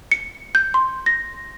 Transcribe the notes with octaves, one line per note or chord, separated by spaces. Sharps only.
C#7
G6
C6
A#6